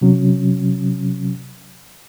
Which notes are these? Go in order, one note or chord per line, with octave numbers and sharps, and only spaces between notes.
C3 F#3 C#4